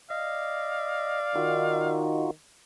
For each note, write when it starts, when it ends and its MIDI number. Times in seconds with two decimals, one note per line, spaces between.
0.10 2.30 74
0.10 1.20 75
0.10 1.98 77
1.36 2.30 51
1.36 2.31 63
1.36 2.31 65
1.36 2.31 66